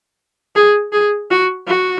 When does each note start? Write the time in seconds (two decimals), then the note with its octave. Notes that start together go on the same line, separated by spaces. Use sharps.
0.56 G#4
0.93 G#4
1.31 F#4
1.68 F#4